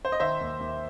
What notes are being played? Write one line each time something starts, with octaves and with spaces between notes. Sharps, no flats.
C5
D#5
D#3 C5 E5
D#2
D#2